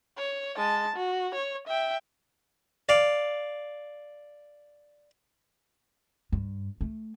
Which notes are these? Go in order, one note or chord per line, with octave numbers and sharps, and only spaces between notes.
C#5
G#3 A5
F#4
C#5
E5 G5
D5 F5
G2
A3